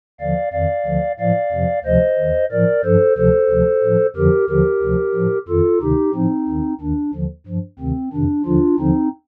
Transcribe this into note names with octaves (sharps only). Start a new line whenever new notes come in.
D#2 D3 F3 D5 F5
F2 D#3 D5 F5
D2 D3 F3
A2 F3 D5 F5
F2 C3 F3
D2 C3 F3 C5 D#5
D#2 D#3
A2 F3 A#4 D5
G2 F3 A4 C5
D2 C3 F3 A4 C5
D2 C3 F3
A2 F3
F2 D3 F3 G4 A#4
D#2 D3 F3 G4 A#4
D2 C3 F3
A2 F3
F2 D#3 F4 A4
D2 C3 D#3 D#4 G4
A2 F3 C4 D#4
D#2 D#3
D#2 D#3 D4
D#2 D3 F3
G2 F3
D2 C3 D#3 C4
F2 C3 D#3 D4
D#2 D3 F3 D4 F4
D#2 D3 F3 C4 D#4